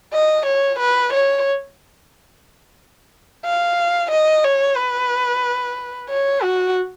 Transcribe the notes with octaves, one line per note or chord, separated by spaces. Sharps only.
D#5
C#5
B4
C#5
F5
D#5
C#5
B4
C#5
F#4